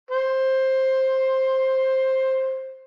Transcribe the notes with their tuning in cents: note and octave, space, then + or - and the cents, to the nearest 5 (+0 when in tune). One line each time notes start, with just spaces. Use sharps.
C5 +10